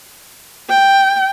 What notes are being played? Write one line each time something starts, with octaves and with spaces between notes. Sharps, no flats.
G5